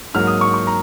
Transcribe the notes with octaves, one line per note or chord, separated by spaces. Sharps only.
G#2 F#3 A#3 F6
D#6
C#6
C#6
A#5